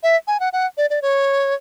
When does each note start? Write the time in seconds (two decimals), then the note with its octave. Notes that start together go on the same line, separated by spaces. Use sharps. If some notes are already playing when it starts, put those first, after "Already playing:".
0.03 E5
0.28 G#5
0.40 F#5
0.53 F#5
0.78 D5
0.90 D5
1.02 C#5